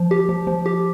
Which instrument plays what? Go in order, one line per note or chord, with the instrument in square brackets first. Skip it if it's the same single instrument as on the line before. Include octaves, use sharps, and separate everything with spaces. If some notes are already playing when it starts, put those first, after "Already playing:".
Already playing: [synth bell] F3
G4
F3
F3
G4